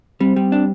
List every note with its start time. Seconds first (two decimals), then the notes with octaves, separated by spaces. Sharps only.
0.20 G3 C4
0.36 G3
0.52 D4